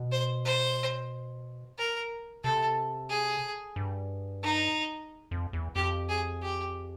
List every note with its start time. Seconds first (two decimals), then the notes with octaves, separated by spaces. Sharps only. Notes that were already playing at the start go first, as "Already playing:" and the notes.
Already playing: B2
0.12 C5
0.45 C5
1.78 A#4
2.44 C3 A4
3.10 G#4
3.76 G2
4.43 D#4
5.31 F2
5.53 E2
5.75 F2 G4
6.09 G#4
6.42 G4